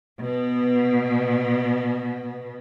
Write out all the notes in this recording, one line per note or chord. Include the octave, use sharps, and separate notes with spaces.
B2 B3